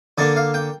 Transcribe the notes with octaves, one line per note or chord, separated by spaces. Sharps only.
D3 A#3 D4 D5
F5
G5